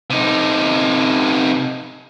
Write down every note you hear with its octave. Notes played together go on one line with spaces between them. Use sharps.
C3 D#4